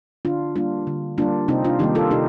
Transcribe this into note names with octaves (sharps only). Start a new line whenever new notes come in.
D3 D4 F4
G3 A#3 D4 F4
D3
G3 A#3 D4 F4
C3 C4 D#4
D4 F4
D#3 G3 A#3 D#4 G4
F4 A4
C3 D#4 G4